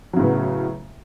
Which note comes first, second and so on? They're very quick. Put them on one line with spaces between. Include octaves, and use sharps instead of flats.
F#3 C#3 A2 B3